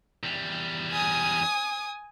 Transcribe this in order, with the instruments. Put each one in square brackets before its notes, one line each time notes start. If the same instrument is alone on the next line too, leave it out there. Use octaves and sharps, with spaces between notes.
[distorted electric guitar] E2 G3
[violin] G#5 D#6